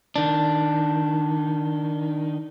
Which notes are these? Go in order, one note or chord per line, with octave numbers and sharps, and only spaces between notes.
D#3 D4